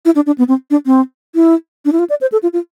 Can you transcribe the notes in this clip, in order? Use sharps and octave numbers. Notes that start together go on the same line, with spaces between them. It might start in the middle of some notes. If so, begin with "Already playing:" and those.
E4
D4
D4
B3
C4
D4
C4
E4
D4
E4
F4
D5
C5
A4
F4
F4